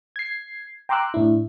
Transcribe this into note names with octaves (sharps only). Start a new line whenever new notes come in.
G#6 C7
G5 A#5 C6 D6 E6 F#6
A2 D4 E4